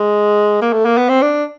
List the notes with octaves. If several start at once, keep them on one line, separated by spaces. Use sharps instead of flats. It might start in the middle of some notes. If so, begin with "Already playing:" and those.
Already playing: G#3
A#3
A3
A#3
B3
C4
D4